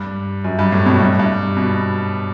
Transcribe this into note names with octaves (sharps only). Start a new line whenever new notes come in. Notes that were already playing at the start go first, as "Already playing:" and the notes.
Already playing: G2
F#2
G2
A2
B2
G2
G2
B2